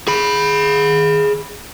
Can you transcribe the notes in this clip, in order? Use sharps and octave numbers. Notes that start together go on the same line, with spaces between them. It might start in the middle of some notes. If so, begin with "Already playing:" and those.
G#4 B5